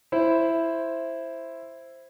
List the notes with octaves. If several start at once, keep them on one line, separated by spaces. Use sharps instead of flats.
E4 C5